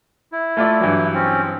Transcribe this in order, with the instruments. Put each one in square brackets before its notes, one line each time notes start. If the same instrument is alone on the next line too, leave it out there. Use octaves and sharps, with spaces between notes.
[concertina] E4
[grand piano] A3 F4 D5
G2 E3 F#3
[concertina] C4 C#4